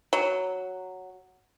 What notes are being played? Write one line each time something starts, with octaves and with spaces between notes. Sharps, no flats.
F#3